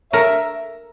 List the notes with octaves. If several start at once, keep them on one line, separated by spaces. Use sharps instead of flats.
A#4 C#5 E5